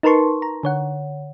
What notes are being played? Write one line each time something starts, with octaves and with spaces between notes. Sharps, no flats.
D#4 A#4 B4 A5 C6 C#6
A#5
D3 C#5 F#5